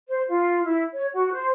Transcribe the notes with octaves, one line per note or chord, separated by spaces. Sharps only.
C5
F4
E4
C#5
F#4
C5